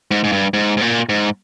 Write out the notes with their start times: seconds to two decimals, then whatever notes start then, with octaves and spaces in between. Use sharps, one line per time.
0.11 G#2
0.24 G#2
0.32 G2
0.54 G#2
0.77 G#2
0.81 A#2
1.09 G#2